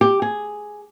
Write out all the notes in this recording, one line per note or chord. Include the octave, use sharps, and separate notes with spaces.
G4
G#4